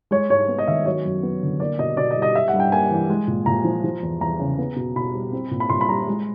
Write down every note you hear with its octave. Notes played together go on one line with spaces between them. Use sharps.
G#3 C#5
G#2 C#5
B3
D#5
D#3 E5
F#3 C#5
F#2
B3
D3
A#3 D5
B2 D#5
B2 D5
D#5
G3
D#5
G3 E5
F#5
G2
G5
A#3 G#5
E3
G#3
A#2
A#2 A#5
F3
F3
E2
E2 A#5
C#3
B3
B2
B2 B5
G3
C4
A#2
B5
A#2 C6
B5
G3 A#5
G#3